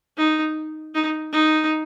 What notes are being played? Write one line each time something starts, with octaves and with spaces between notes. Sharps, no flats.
D#4
D#4
D#4